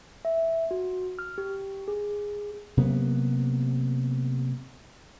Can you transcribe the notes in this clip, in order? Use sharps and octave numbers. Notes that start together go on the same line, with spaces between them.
E5
F#4
F6
G4
G#4
C3 F#3 A#3 B3